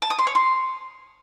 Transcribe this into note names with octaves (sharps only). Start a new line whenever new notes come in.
A5
D#6
C6
C#5
C6